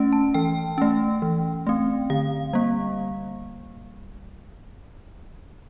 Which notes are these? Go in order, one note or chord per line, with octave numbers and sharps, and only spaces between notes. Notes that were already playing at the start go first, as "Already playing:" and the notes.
Already playing: A3 C#4
A5
E3 G5
A3 C#4
E3
A3 C4
D3 F5
G3 A#3